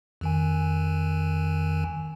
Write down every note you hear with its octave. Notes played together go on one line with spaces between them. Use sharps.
F2 D#3 G#5